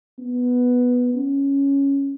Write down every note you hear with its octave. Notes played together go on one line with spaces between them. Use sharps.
B3
C#4